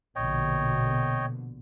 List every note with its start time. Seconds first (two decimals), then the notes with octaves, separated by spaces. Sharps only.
0.16 A#1 B2 D3 C#5 D#5 G5